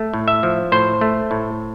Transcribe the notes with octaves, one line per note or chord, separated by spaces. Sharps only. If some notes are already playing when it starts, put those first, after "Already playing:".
Already playing: A3
A2
E5
F3
A2 C5
A3
A2